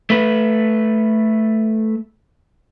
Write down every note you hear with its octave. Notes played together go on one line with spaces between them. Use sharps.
A3 B4